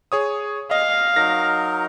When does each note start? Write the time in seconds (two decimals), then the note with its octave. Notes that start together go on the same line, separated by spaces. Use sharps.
0.12 G#4 C#5 D#6
0.71 D#5 F5
1.16 F#3 D#4 A#4 A#6